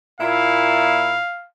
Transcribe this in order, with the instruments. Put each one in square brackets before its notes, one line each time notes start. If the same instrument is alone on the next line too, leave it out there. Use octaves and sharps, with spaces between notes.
[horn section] A#2 E4 [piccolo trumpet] F5